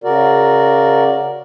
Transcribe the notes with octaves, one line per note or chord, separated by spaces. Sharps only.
C#3 F#4 A#4 D5